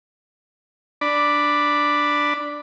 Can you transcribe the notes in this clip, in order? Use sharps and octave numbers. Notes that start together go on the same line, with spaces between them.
D4 D5 B5